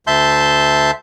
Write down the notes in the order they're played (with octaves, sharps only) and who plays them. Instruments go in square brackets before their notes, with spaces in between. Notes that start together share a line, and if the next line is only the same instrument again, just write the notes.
[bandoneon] D2 E5 A5 C6 G6